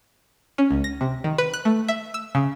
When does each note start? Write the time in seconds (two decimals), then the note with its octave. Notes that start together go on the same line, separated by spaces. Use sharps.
0.58 C#4
0.71 C#2
0.84 A#6
1.01 C3
1.24 D#3
1.38 B4
1.53 F#6
1.65 A3
1.88 E5
2.14 E6
2.35 C#3